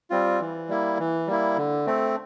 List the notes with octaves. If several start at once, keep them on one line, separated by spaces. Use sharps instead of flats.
G3 C4 F4
E3
G3 A#3 E4
E3
G3 A#3 E4
D3
A3 C4